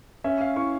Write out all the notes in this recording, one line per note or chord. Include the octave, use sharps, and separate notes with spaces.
C#4 E5
F5
E4 C#6